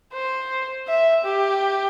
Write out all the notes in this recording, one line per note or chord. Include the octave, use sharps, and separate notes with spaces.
C5
E5
G4